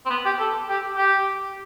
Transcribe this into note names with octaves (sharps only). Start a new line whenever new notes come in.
C4
B3
G4
A4
G4
G4